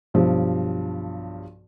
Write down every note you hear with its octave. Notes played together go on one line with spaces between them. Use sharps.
B1 G2 F3